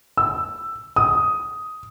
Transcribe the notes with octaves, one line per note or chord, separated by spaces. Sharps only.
E6
D#6